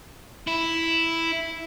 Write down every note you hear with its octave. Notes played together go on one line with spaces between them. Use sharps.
E4